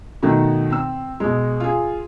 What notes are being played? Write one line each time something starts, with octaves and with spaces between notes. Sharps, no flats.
B2 D#3 A3 F#4
C4 E6
B2 G#3
F4 G#4